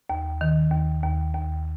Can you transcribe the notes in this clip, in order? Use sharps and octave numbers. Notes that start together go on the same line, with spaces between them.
D#2
D#3
D#2
D#2
D#2